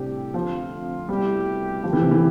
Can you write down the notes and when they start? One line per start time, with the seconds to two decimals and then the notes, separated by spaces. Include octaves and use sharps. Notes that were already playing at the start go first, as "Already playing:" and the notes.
Already playing: A2 C3 G3 D4 G4
0.34 F2 D3 F3 A3 C4 F4
1.09 C2 B2 G3 A3 E4 G4
1.83 D3 F3 A3 E4 G4 B4
1.93 E3
2.02 C3
2.11 E3